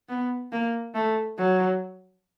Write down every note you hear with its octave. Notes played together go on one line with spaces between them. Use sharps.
B3
A#3
A3
F#3